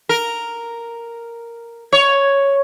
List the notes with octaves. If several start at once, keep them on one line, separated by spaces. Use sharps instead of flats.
A#4
C#5